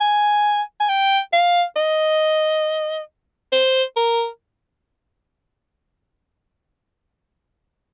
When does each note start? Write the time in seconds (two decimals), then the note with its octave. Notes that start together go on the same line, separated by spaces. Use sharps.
0.01 G#5
0.80 G#5
0.89 G5
1.33 F5
1.76 D#5
3.52 C5
3.96 A#4